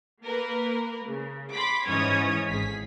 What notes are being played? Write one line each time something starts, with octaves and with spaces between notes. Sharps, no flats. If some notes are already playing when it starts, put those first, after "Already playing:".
A#3 A#4 B4
C#3
B5 C6 D6 B6
G#2 E3 C#4 C#5 D#6 G#6
G#1 G#4 B6